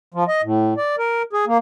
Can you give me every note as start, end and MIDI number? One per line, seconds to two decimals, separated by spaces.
0.14 0.24 53
0.28 0.42 75
0.43 0.74 45
0.77 0.96 74
0.98 1.22 70
1.33 1.45 68
1.47 1.58 58